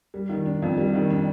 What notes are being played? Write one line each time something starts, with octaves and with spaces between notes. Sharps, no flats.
G3
D#3
D4
F2
G3
D#3
D4